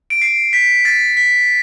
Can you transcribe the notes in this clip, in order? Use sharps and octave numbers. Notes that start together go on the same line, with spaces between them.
D7
C7
B6
A6
B6